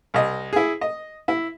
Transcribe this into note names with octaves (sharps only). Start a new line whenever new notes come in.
C2 D#5
E4 G#4
D#5
E4